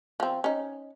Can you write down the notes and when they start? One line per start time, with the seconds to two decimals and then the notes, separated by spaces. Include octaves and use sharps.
0.20 F3 C4
0.44 C#4 D#4